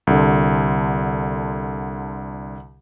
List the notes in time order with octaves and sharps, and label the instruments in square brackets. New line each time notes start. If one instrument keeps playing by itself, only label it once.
[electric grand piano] C2 D3